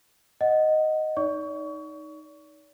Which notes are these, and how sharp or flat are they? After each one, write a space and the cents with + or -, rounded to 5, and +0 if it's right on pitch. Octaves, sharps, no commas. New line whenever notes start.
D#5 +0 F#5 +0
D#4 +0 D5 -40 C#6 +25